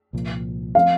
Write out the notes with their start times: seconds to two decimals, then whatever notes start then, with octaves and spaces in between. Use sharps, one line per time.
0.13 C2 A#2 F3
0.75 F3 C4 F5